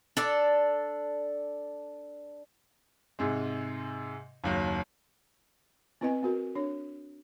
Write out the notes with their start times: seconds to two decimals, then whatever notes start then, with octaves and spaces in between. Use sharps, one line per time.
0.17 D4 A4 D5
3.19 G#2 C3 G#3
4.44 F#1 D#2 F#3
6.01 B3 C4 E4 B4 D#5 G#5
6.23 B3 F#4 A#4
6.55 D4 C#5